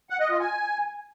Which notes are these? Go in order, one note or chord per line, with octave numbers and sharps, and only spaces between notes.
F#5
D#5
F4
G#5